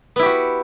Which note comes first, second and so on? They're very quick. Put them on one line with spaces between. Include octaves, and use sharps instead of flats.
B3 E4 G4 F#4